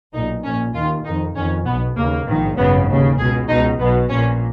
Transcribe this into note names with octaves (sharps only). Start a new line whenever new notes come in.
B1 A#2 D#4
A#1 A#2 C#4
D#2 D#3 F4
F2 D#3 D#4
F2 D#3 C#4
B1 B2 B3
D#2 C#3 A#3
A#1 G#2 D#3
G#1 F#2 C#3 B3
D#2 C#3
C#2 B2 G#4
C#2 B2 D#4
B1 B2 B3
A#1 A#2 C#4